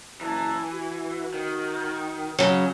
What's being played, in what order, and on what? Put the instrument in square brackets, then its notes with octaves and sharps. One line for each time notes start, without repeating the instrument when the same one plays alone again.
[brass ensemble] F#1 A5 A#5 [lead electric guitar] E3
[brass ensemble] F#4
[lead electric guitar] D#3
[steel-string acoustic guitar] C#3 F#3